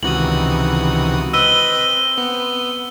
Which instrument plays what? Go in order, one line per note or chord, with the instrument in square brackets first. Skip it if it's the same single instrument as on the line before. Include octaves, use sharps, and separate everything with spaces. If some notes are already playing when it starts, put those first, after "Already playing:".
[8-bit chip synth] C#2 F#4 D#6 [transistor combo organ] C3 D#3 E3 [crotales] F#7
[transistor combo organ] C4 [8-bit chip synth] B4 D#5 [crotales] E6 D#7 G7
[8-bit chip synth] B3